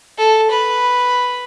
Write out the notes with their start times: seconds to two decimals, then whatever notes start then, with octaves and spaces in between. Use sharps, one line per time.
0.18 A4
0.51 B4